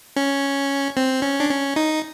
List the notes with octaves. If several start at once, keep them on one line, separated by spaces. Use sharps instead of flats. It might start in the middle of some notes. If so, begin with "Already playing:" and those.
C#4
C4
C#4
D4
C#4
D#4